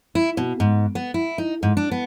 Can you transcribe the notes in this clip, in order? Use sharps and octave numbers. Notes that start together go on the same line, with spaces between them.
E4
B2
G#2
B3
E4
D#4
G#2
D4
B3